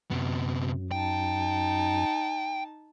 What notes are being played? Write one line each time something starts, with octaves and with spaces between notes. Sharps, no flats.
F#2 C3 B3
D#4 G5 A5